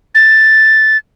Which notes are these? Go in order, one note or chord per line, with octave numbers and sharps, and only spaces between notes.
A6